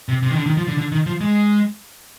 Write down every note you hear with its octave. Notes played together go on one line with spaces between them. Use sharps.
C3
C3
D#3
D3
D#3
F3
D3
D3
D#3
F3
G#3